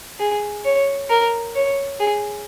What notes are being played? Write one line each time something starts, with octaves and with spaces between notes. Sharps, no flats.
G#4
C#5
A#4
C#5
G#4